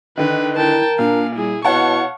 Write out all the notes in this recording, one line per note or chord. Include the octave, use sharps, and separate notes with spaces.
D3 D#3 B4
E4 A#4 G5 A5
A#2 D4 F5
G3 E4 G#4
B2 E4 C#5 F5 F#5 A5 C#6